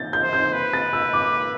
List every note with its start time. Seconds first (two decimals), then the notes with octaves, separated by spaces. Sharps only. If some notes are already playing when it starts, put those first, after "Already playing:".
Already playing: G6 A6
0.13 G6
0.23 C5
0.33 G6
0.53 B4
0.73 A6
0.93 E6
1.13 D6